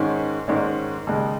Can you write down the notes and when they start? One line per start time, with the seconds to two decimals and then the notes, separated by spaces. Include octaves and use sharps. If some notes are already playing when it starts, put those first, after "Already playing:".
Already playing: G#2 D#3 G#3 C#4
0.48 G#2 D#3 G#3 C#4
1.07 D#2 C#3 G#3